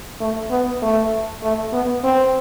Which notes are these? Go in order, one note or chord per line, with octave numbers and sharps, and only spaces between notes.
A3
B3
A3
A3
B3
C4